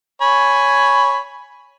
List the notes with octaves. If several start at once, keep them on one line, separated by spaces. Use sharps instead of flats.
C#5 G#5 B5